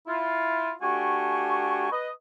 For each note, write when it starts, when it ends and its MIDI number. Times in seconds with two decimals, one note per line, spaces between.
0.07 0.71 64
0.07 0.71 65
0.82 1.90 57
0.82 1.90 62
0.82 1.90 66
0.82 1.90 67
0.82 1.90 80
0.82 1.90 85
1.91 2.09 71
1.91 2.09 75